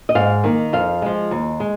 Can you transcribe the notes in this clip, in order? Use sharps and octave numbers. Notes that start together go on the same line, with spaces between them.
D#5
G#2 F5
D#3 A#3
F2 F5
F3 G#3
D#2
G#3